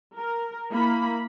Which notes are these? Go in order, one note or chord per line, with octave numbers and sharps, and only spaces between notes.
A#4
A#3 E4 B5